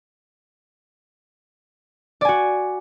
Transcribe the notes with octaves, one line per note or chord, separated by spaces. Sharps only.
F#4 D5 G#5